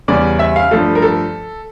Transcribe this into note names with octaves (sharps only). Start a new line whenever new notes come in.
E2 C#3 G3 D5
E5
F5
G2 F3 A3 A4
A#4
A4